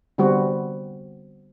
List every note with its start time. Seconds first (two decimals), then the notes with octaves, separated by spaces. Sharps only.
0.18 D3 G3 B3 C4 F#4